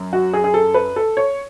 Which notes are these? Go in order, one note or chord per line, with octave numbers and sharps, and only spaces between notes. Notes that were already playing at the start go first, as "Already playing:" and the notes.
Already playing: F#2
F#4
G#4
G#4
A4
B4
A4
C#5